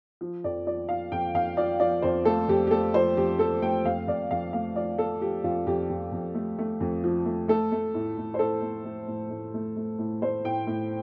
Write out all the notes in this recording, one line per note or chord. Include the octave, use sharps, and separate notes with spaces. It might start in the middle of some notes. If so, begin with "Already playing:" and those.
F3
F2 D5
F3 D5
F3 F5
F2 G5
F2 F5
F3 D5
F3 D5
F2 C5
A3 A4
F2 G4
G4
A3 A4
F3 C5
F2 G4
F3 A4
A3 G5
F2 F5
F2 D5
F2 F5
A3 F5
F3 D5
A3 A4
F3 G4
F2 F4
F2 G4
F2
F2
A3
A3
F2
F3
A3
A3 A4
A3
A2
A2
C5
A2 A4
A3
A3
A2
A2
A3
A3
A2
A3 C5
A2 G5
A2